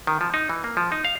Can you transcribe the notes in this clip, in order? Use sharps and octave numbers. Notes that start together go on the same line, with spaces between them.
D#3
F3
D#4
E3
A#3
F3
D#4
F5